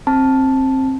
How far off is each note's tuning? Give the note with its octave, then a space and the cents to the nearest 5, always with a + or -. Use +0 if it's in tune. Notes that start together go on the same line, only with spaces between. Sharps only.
C4 +20 A5 +0